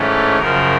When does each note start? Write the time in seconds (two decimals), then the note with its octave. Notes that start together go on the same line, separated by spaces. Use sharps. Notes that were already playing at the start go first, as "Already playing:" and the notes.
Already playing: G#2 E3 A3 C#4
0.09 A4
0.38 F#2 C#3 F3 A#4